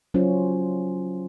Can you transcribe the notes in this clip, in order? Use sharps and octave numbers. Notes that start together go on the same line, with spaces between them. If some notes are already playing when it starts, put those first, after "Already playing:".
F#3 C#4 F4 C5